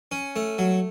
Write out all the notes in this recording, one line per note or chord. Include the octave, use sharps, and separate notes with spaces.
C#4
A3
F#3